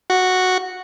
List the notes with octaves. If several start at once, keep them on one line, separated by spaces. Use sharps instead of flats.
F#4